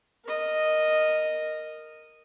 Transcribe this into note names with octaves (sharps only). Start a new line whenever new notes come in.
A#4 D#5